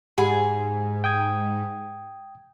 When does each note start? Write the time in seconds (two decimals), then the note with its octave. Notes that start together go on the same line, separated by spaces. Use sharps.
0.18 G#2 G4 G#4 F#5 B5
1.04 G5 D#6 G#6